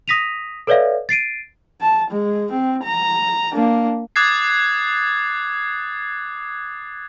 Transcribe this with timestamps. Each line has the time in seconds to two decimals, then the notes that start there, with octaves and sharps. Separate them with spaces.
0.08 D#6 A#6 B6 D#7 F7
0.67 A4 B4 C#5 D5 E5 F5
1.09 A6 C7 D7 D#7
1.81 A5
2.10 G#3
2.51 C4
2.83 A#5
3.54 A#3 D4
4.16 D6 D#6 F#6 G#6 A6 C7